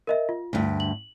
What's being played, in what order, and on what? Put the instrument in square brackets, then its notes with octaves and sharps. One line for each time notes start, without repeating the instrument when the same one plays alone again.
[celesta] A#4 D#5 E5
F4
[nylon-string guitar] D2 G2
[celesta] F#7